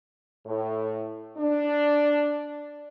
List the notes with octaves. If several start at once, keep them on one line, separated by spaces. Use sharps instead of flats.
A2
D4